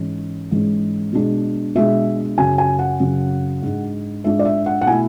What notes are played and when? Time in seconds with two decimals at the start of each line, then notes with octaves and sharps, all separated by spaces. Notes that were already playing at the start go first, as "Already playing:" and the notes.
Already playing: G#2 E3 G#3 C#4
0.51 G#2 E3 G#3 C#4
1.13 B2 G#3 D4
1.75 B2 G#3 D4 E5
2.38 F#2 C#3 F#3 G#5
2.58 G#5
2.79 F#5
3.00 F#2 C#3 F#3
3.62 G#2 G#3 D4
4.24 G#2 G#3 D4 E5
4.39 D5
4.45 E5
4.66 F#5
4.81 F#5
4.86 B2 A3 E4 G#5